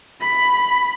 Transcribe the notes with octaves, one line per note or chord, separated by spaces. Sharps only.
B5